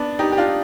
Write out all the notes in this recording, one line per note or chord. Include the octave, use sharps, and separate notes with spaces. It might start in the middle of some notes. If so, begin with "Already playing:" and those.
Already playing: B3 D4
D#4 G4
G4
D4 F4